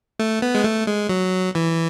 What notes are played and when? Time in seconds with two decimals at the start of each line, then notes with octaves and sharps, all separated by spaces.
0.19 A3
0.42 B3
0.55 G#3
0.64 A3
0.87 G#3
1.09 F#3
1.55 E3